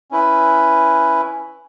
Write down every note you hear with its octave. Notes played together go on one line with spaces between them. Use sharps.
C#4 E4 B4